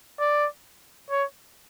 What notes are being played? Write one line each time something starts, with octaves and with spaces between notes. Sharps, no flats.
D5
C#5